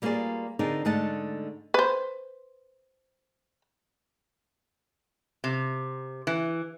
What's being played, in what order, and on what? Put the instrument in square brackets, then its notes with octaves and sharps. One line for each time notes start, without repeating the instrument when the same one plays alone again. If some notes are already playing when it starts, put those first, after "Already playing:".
[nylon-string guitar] G3 A#3 B3 F4 G#4 D5
D3 C4 D#4 G#4 A#4 D5
G#2 D3 A3 D#5 F#5 A5
[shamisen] B4 C5
[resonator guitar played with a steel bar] C3
E3